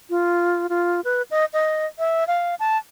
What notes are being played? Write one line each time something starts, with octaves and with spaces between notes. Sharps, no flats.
F4
F4
B4
D#5
D#5
E5
F5
A5